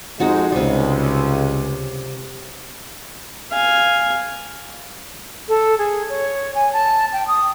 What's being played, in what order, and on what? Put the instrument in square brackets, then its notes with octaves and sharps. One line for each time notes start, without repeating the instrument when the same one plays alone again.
[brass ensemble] F2 G#3 [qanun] D#4 F#4 C5
[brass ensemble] C#2 [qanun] C3 G3
[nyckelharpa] F5 G#5
[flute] A4
G#4
C#5
G#5
A5
G5
D#6